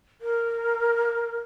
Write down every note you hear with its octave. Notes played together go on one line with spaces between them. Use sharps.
A#4